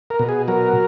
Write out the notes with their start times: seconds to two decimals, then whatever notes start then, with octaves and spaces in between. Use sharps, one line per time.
0.10 A#4
0.19 B2
0.29 G#4
0.48 F#3 A#4